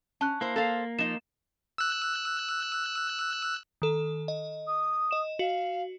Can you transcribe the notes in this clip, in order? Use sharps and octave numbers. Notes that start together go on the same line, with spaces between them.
C#4 A5 F#6
A#3 E4 C5
A4 C5 F5
F3 D#4 E7
E6 F#6
D#3 A4
D#5
D#6
D#5 E7
F#4 F5